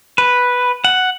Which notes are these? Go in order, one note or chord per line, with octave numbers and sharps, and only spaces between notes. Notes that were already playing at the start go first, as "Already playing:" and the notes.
B4
F#5